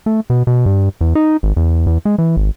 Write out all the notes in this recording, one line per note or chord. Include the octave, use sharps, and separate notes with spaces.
A3
B2
B2
G2
E2
D#4
G#1
E2
E2
G#3
E3
G#1